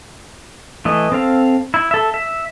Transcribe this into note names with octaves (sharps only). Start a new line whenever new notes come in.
E3 A3 D#5
C4 A4 F5
E4
A4 E5
E5